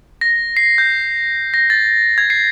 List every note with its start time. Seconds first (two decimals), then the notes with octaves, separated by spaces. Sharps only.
0.21 A#6
0.57 C7
0.78 G6
1.54 A#6
1.70 A6
2.18 G#6
2.30 C7